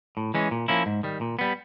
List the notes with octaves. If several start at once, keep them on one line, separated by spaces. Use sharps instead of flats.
A2
E3 G#3 C#4
A#2
F3 A#3 C#4 E4
G#2
D#3 G3
A#2
G3 B3